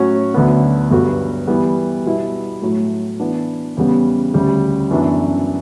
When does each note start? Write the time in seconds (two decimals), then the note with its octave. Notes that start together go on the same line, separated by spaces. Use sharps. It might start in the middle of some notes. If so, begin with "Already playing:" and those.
Already playing: A2 F#3 C#4 F#4
0.34 D2 D3 F#3 B3
0.91 G2 F#3 B3 F#4 A4
1.47 E3 G3 B3
2.06 B2 G3 B3 E4
2.62 A2 F#3 A3
3.20 E3 B3 D4
3.77 E2 C#3 G3 B3
4.34 D2 C#3 G3
4.91 F#2 E3 B3 D4